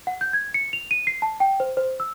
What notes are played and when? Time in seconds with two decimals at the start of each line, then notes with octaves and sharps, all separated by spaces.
0.07 F#5
0.21 G6
0.33 G#6
0.54 C#7
0.73 F7
0.91 D#7
1.07 C7
1.22 A5
1.40 G5
1.60 C5
1.77 C5
2.00 E6